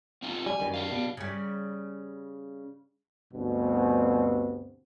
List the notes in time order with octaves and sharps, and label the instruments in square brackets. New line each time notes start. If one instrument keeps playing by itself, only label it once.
[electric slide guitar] C4 D#4 F4
[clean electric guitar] G3 [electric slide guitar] G#5
[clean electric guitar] F#2 D#3 G3
[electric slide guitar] D4 F5
[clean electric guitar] B2
[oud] C#3 G3
[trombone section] D2 G2 B2 C4